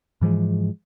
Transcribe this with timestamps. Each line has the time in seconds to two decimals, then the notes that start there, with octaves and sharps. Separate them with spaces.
0.21 G#2 E3 F3 G#3